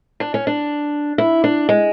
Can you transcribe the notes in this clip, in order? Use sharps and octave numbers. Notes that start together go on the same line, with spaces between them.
D4
C#4
D4
E4
D4
G#3